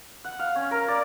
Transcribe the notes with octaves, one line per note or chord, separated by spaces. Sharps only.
F#5
F5
C#4
A#4
D5